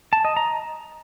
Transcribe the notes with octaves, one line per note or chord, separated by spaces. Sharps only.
A5
D#5
A#5